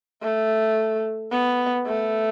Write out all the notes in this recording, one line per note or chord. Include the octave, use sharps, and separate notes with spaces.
A3
B3
A3